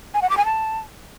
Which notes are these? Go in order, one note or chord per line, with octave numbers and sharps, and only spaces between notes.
G#5
F#5
D6
G#5
A5